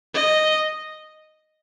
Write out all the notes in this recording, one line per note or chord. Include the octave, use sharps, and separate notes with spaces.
D#5